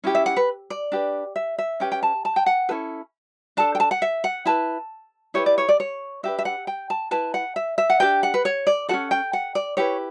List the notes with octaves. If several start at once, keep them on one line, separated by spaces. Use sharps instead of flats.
C#4 E4 G4
E5
F#5
B4
D5
D4 G4 B4
E5
E5
C#4 G4 B4 G5
G5
A5
A5
G5
F#5
C#4 E4 A4 B4
D4 A4 A5
G5
A5
F#5
E5
F#5
E4 B4 A5
E4 G4 B4 C#5
D5
C#5
D5
C#5
D4 G4 B4 E5
E5
F#5
G5
A5
E4 B4 A5
F#5
E5
E5
F#5
D4 G4 B4 G5
F#5
B4
C#5
D5
C#4 F#4 A4 F#5
G5
F#5
D5
E4 G4 B4 C#5